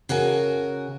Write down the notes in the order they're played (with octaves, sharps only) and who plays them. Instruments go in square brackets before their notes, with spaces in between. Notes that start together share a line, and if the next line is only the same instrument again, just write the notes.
[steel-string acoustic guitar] C#3 F#4 A#4 G#5